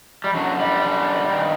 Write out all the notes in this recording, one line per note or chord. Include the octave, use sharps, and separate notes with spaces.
G3
F#2 D3 F#3
G3
F#2 D3
G2 D#3